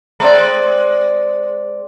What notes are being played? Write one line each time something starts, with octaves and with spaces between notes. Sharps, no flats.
G#3 C4 D5